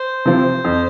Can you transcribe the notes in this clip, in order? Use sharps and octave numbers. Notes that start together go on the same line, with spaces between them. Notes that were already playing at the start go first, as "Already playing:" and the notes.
Already playing: C5
C3 F3 C4
F2